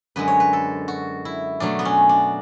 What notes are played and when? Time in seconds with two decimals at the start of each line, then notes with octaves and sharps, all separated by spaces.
0.16 F#2 D3 G#3 B4
0.28 C#5
0.40 B4
0.53 A4
0.88 F#4
1.25 E4
1.60 B2 F#3 A3 D4
1.79 B3
1.85 C#4
2.09 D4